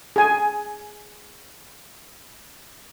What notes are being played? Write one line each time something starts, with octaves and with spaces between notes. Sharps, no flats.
G#4 G#5